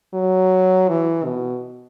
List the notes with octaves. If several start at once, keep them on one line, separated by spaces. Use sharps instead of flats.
F#3
E3
B2